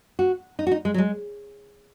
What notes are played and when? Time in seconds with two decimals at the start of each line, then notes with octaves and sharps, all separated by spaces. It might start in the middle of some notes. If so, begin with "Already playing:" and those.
0.19 F#4
0.59 D#4
0.67 F#4
0.72 D#4
0.85 G#3
0.94 F#3
0.98 G#3